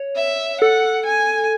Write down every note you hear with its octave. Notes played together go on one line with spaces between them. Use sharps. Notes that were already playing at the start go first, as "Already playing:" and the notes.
Already playing: C#5
E5
A4 F#5
G#5